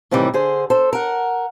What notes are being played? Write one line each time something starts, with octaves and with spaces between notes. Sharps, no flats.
A2 C3 D#3 E3 G3
D3 G#4 C5
A4 C5
A#4 F#5